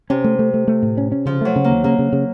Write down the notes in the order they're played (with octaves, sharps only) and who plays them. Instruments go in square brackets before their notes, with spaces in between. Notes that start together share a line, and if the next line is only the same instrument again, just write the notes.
[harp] C3 [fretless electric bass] C#4
[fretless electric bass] A3
A3
A3
A3
A2
C#4
C#4
[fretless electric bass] C#3 [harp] F3
[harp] F#3 [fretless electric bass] A3
[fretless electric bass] C#3
[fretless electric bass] D#2 [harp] A#3
[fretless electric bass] C#3 [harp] A#3
[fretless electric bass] C#3
C#3